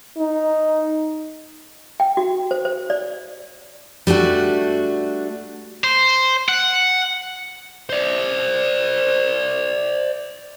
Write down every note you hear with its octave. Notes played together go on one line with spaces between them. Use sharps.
D#4
G5
F#4
C5
C5
D5
G3 A3 D4 F#4
C5
F#5
C5 D5